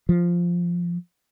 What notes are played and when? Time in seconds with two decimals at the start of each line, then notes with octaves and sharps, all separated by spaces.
0.09 F3